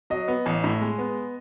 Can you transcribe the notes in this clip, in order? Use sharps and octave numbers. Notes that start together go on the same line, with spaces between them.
F#3 D#5
B3
A1
A2
G#3
B3